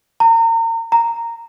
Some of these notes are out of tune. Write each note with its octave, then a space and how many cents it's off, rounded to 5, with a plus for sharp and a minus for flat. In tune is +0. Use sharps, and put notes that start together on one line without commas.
A#5 -35
A#5 -10